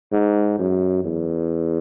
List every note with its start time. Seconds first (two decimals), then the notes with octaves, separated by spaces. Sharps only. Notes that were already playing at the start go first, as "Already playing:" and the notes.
0.12 G#2
0.59 F#2
1.04 E2